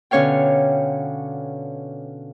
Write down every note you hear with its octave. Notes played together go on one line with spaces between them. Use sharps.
B2 D3 C#4 C#5 F5 G5